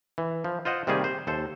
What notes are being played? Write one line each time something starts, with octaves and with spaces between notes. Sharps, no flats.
E3
F3
F4 C5 D#5 F#5
C3 D#3 G3 A#3 G#4
C5
D#2 A4 C5